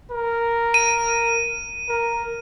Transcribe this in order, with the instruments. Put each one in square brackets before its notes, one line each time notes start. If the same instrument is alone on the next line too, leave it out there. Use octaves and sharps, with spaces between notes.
[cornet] A#4
[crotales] D#7
[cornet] A#4